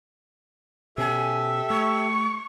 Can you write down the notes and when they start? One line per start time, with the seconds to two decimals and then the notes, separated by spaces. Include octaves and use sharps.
0.98 B2 C#4 G4 A4 E5 G#5
1.70 A3 C#6